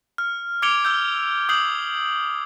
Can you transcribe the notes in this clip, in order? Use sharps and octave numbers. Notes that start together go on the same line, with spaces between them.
F6
D6 G#6 C#7 D7 F7 G7
E6 G6
D6 D#6 G6 C7 F#7